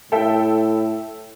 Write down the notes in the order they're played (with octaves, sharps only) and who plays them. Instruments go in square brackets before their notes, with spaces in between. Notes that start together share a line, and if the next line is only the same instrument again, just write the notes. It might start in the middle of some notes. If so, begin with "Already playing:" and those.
[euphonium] A2 [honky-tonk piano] A4 E5 G5